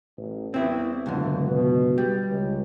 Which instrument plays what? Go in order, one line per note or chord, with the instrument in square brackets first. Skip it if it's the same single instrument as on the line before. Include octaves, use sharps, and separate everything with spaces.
[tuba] A1
[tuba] E2 [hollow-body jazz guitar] C4 E4
[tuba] E1 [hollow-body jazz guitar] C#2 F#2 D3
[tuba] B2
[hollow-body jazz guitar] G3
[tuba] C#2